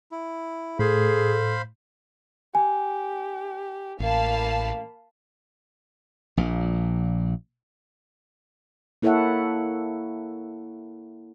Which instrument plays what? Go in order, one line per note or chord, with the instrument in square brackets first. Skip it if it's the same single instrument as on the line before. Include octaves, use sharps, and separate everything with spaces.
[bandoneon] E4
[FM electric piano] A2 [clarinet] G#4 [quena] A4 [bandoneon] C5 F5 B5
[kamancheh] G4 [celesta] G#5
[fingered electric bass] A1 [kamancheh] A#3 [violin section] F5 A5 B5
[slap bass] A#1 A#2
[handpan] A#3 E4 A4 C#5 E5 F#5